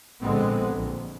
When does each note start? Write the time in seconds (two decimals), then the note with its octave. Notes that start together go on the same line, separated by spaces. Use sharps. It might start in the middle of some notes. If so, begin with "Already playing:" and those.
0.21 A#1 D3 G#3 B3 C4
0.74 A#1